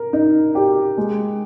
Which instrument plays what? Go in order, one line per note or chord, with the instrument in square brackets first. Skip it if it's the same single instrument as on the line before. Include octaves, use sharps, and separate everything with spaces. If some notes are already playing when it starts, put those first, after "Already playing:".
Already playing: [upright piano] A#4
D#4
G4
G#3